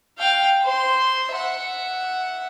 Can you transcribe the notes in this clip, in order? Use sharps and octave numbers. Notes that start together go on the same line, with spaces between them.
F5 G5
C5 C6
E5 F#5